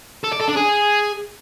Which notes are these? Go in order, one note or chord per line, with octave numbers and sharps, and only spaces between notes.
A4
D5
A4
D4
G#4